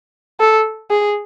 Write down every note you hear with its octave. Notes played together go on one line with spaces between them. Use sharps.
A4
G#4